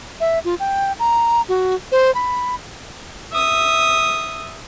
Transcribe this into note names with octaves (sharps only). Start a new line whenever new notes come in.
E5
F4
G5
A#5
F#4
C5
B5
E5 D#6